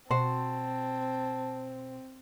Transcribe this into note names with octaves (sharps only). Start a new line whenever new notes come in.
B2 C4 F#4 C5 A5